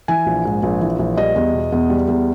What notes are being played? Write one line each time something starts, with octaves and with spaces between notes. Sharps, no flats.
E3 G#5
A#1
G#2
A#1
E3
A#1
G3 D#5
E2
B2
E2
G3
E2